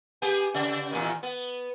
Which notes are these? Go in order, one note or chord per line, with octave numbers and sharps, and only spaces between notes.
B3 G4 G#4
C#3
E2 A#2 D#3
B3